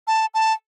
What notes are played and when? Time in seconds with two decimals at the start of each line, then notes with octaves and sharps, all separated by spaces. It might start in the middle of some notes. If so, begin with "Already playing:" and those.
0.07 A5
0.34 A5